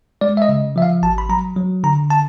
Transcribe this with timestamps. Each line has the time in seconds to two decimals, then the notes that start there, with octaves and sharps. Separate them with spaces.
0.21 G#3 D5
0.37 E5
0.42 D#5
0.49 C#3
0.76 F3 E5
0.82 F5
1.03 G#1 A5
1.18 B5
1.29 F#3 A#5
1.57 F#3
1.84 D3 A#5
2.11 A5